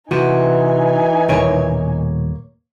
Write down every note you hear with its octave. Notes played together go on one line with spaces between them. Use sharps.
C3 E3 D#4 F#4 G#5
D#1 B2 A#3 C#5